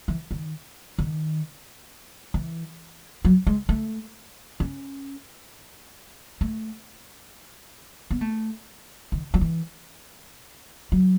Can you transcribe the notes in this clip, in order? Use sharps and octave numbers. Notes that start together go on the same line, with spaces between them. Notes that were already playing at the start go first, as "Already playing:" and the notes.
E3
D#3
D#3
E3
F#3
G#3
A3
C#4
A3
B3
A3
D#3
F#3
E3
F#3